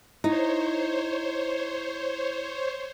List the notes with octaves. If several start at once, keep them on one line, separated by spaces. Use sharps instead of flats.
D#4 E4 C5 C#5